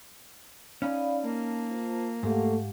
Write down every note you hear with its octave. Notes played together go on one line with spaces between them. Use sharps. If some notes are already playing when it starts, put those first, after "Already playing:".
C#4 D#4 D5 F5 B5
A#3 A5
F4 C5 A5
G#2 A3 G4 F5 F#5